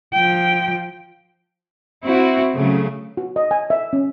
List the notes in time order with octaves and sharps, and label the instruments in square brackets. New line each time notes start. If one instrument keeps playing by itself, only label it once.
[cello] F3 G5
[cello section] C4 E4 F#4
C#3 F#3 A3
[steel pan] F#4
D#5
G#5
E5
C#4